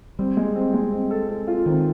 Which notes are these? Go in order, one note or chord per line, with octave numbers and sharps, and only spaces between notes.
G3 C4
G#3
C4
G#3
C4
A4
A4
F4
D#3 C4